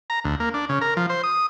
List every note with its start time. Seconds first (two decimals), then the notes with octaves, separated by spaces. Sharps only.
0.10 A#5
0.24 D2
0.40 A#3
0.54 D4
0.69 C#3
0.81 A#4
0.97 F3
1.09 C5
1.23 D#6